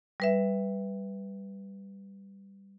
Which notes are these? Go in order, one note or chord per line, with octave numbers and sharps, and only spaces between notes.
G3 B4 E5